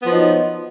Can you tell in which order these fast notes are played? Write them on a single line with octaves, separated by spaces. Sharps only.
B3 F3 F#3 D#4